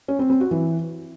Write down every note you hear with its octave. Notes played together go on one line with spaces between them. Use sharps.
C#4
C4
C4
F#4
E3